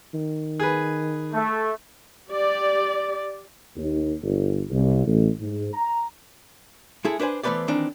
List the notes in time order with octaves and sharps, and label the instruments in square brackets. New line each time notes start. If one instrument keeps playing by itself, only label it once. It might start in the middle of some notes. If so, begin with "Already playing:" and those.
[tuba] D#3
[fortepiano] G#4 B4
[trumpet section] A3
[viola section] G4 D5
[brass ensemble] D#2
G1
C2
A1
G#2
A#5
[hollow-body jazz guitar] G#3 E4 G#4 A4
D4 B4 C5 G#5
E3 A3 B3 B4 C5 D5
D#3 E3 C4 D4